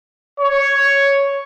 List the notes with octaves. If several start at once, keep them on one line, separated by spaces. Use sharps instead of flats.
C#5